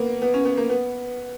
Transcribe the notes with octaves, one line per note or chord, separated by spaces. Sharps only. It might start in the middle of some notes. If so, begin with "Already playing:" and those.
Already playing: A#3 B3
B3
C#4
B3
A#3
B3